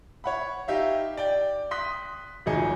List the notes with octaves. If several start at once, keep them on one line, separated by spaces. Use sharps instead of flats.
C#5 F#5 B5
D#4 G4 E5 F5
D5 G5
C6 D#6 F#6 B6
D1 G#1 F3 D#4 G#4 C#7